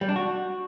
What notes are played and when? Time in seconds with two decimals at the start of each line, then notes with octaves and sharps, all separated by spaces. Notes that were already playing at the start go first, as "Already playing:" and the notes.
0.01 G3
0.09 D4
0.16 F#4